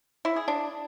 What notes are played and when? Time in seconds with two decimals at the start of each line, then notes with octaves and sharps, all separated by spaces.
0.25 E4
0.36 G#4
0.48 D4